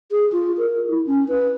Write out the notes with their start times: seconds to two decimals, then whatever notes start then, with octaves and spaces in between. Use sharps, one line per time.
0.12 G#4
0.32 F4
0.58 A#4
0.89 E4
1.07 C#4
1.28 B4